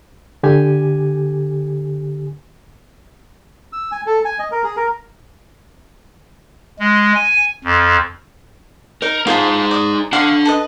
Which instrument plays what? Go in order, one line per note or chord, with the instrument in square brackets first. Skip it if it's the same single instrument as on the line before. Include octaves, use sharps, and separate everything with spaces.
[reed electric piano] D3 G4 G#5
[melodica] E6
G#5
A4
G#5
D#5
A#4
G#4
A#4
[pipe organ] G#3
G#5
F2
[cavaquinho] D#4 [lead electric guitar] A#4
[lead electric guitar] D#4 G#4 [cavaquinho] F4 C5 A5
[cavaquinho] D5 D#6
[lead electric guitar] D4 F#5 [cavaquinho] F5 C#6
[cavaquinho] A4 B4 D#5